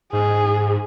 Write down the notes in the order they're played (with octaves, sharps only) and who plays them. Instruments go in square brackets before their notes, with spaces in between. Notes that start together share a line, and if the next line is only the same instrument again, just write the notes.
[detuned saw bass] G#2 [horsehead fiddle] G#4